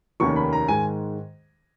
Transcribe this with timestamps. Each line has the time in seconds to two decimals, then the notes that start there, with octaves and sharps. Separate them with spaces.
0.20 F1 D#2 D#3 A#3 C#4 C#6
0.36 B5
0.53 A#5
0.68 G#2 D#3 G#3 G#5